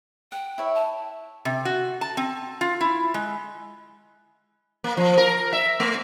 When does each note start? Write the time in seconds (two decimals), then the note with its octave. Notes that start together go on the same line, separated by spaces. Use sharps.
0.32 F#5 G5
0.58 E4 C#5 E5
0.75 A5
1.45 C3
1.65 F#4
2.01 A5
2.17 C4
2.61 F4
2.81 E4
3.14 G#3
4.84 A#3
4.97 F3
5.17 A#4
5.53 E5
5.80 A3